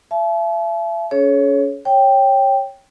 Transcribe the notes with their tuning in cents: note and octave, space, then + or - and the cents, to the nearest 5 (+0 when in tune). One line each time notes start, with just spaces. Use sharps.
E5 +40 A5 -40
C#4 +30 G#4 +40 C#5 +0
C#5 -10 G5 +0